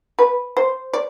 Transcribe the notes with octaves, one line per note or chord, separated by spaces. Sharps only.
B4
C5
D5